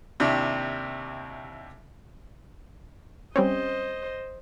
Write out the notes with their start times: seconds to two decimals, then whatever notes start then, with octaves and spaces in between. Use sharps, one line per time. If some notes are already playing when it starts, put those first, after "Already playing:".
0.20 D#2 C3 D4 E4
3.36 G3 C4 C#4 C5 D#5